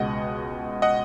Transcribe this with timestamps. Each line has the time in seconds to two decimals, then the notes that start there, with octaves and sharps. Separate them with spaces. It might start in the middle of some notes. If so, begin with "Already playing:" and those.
Already playing: C#2 B2 G#3 D#5 F#5
0.82 D#5 F#5